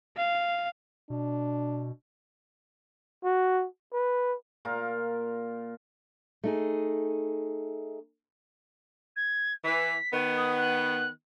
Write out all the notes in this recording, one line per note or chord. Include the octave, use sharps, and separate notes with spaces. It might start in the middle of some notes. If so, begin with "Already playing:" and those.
F5
B2 D4
F#4
B4
A#2 F4 A#4
A3 D#4 G#4
G#6
E3 B6
D#3 B3
D#6
F#6